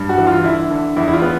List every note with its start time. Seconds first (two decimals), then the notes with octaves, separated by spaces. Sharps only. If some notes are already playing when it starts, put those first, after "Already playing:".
Already playing: G2
0.09 F#4
0.18 E3
0.27 F4
0.44 D3 E4
0.71 D3
0.96 E2 E4
1.08 E4
1.13 F4
1.22 B3